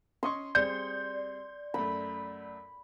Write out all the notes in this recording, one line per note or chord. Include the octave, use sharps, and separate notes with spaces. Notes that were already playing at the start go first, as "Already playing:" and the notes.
C#4 D#5 C6 C#6
G3 C4 G#4 D5 G6
F#2 A3 B5